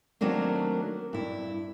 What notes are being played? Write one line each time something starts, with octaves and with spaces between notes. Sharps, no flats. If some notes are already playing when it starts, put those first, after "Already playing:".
D#3 F#3 A3 A#3 C4 D4
G2 E4